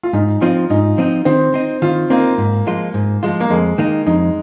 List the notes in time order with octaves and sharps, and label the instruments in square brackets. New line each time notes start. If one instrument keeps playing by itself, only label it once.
[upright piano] F4
[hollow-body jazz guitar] G#2 [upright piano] D#4
[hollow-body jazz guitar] F3 C4 D#4 [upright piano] F4
[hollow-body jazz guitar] G#2 [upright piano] D#4
[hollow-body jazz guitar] F3 C4 D#4
[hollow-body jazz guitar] D#3 [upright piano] C4
[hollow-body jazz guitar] C4 D#4
[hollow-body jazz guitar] D#3 [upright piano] F4
[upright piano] A#3 [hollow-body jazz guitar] C4 D#4
[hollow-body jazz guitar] G#2
F3 G#3 F4
G#2
F3 G#3 F4
[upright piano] A#3
[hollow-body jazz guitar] F2 [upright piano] G#3
[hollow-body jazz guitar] D#3 A#3 D#4
[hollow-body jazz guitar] F2 [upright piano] D#4